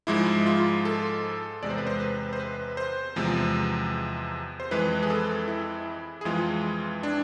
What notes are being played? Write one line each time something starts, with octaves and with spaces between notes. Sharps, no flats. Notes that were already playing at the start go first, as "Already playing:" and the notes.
G#2 F3 G#3 E4
F4
A4
E2 C3 G#3 D5
C5
B4
C5
B4
C5
B4
C5
E2 C3 F3 G#3
C5
F2 E3 G#3 B4
G#4
A4
E4
G#4
F2 E3 G#3 F4
D4